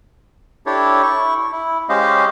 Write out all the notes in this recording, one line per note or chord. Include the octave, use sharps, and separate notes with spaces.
D4 E4 G4 A4 C#5
E4 C#6
E4
G#3 C#4 G4 C5 D#5 F5